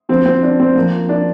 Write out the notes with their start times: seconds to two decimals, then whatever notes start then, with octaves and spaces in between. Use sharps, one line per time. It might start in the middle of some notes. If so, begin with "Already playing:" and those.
0.09 D2 D3 F3 C4
0.26 C4
0.43 D4
0.60 C4
0.75 F2 F3 A#3
1.09 D4